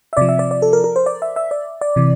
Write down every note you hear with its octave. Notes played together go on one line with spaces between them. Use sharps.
E5
C3 F3 D5
E5
D5
D5
A4
A#4
A#4
C5
D5
E5
E5
D5
D5
C3 E3